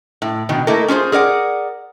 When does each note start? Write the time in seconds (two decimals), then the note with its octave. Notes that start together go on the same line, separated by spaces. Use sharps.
0.22 A2
0.49 B2 D#3
0.67 A3 A#3 D#4 E4 A4 A#4
0.88 C#4 F4 G#4 C5
1.12 G#4 A#4 D5 F#5